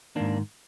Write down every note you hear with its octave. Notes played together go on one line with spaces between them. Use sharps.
G#2 D#3 A#3 D4